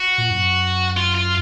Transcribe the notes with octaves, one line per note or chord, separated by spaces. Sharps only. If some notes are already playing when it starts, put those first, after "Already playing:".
Already playing: F#4
A#2
F#2
F4
F4